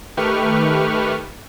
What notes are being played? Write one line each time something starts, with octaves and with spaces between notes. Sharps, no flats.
D#3 A3 G4 B4 C#6 F6